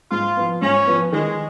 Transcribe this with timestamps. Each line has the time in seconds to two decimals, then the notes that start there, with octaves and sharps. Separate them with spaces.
0.11 G#2 F4
0.37 F3 B3
0.62 G#2 C#4
0.87 F3 B3
1.12 D#3 G#3